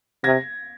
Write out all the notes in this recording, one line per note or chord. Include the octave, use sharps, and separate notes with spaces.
C3 G#6 A#6